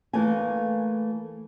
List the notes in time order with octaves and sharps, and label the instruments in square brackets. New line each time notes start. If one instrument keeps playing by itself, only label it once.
[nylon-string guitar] E3 A3 A#3 F5 G#5